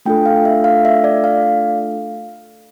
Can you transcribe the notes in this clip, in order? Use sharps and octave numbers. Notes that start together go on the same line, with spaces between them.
A3 D4 F4 A4 G5
F5
E5
F5
E5
D5
F5